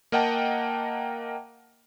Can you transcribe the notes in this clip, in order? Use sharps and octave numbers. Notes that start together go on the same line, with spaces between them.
A#3 A#4 D#5 F#5 G5 A5